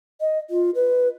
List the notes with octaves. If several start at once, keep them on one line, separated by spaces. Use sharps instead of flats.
D#5
F4
B4